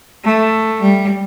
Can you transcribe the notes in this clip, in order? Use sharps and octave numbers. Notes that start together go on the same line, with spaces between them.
A3
G3